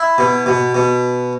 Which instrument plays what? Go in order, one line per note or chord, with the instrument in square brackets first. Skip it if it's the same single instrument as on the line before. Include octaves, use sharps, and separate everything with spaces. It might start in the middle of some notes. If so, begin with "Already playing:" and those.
Already playing: [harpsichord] E4
B2
B2
B2